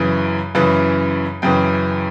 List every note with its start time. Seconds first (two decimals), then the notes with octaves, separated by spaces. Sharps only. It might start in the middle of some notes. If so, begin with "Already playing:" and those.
Already playing: F#2 C#3 E3
0.55 F#2 C#3 E3
1.42 F#2 C#3 E3 G5